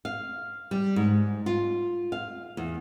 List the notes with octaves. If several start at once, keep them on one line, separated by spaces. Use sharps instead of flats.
F5
G3
G#2
F4
F5
E2